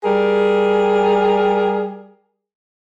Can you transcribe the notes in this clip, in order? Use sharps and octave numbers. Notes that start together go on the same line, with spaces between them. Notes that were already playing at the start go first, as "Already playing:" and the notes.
G3 G#4 A#4